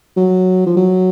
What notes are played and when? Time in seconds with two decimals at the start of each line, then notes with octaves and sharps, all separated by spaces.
0.17 F#3
0.66 F3
0.77 F#3